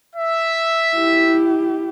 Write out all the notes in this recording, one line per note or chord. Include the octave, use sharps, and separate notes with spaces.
E5
E4 G4